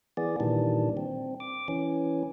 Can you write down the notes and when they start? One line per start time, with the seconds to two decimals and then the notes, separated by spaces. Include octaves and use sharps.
0.17 E3 B3 G#4 D5
0.40 A#2 D#3 E3 G3 D4
0.97 C4
1.40 D6
1.68 E3 C#4